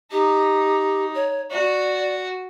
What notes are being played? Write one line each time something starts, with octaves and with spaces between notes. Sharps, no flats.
D#4 G4
C#5
F#4 D5